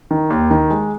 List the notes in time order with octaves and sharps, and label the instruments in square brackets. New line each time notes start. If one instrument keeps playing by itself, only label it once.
[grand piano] D#3
D#2
D#3
G#3